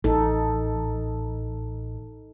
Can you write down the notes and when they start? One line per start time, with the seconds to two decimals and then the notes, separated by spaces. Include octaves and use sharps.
0.04 A1 D#4 A4